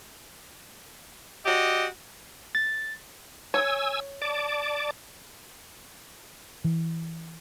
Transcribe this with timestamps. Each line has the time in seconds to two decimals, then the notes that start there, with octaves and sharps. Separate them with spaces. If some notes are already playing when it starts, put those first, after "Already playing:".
1.46 F#4 G4 D5 D#5
2.55 A6
3.54 C#5 G#5 E6
4.22 D5 A5 D6
6.64 E3